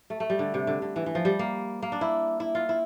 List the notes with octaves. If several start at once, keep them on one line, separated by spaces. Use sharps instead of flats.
A3
A3
G3
D3
C3
D3
D3
E3
E3
F3
G3
A#3
A#3
D4
E4
E4
F4
E4